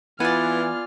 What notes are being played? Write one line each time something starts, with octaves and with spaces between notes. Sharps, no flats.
E3 B3 F4 D5 G#5 F6